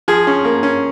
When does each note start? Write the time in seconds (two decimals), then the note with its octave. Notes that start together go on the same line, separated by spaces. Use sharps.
0.08 F3 G#4
0.27 C#4
0.44 A#3
0.63 C#4